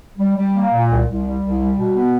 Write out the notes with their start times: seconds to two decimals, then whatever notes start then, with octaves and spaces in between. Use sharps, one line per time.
0.18 G3
0.36 G3
0.53 A#3
0.72 A#2
0.89 C2
1.06 C2
1.24 G3
1.41 C2
1.59 G3
1.76 B2
1.94 B3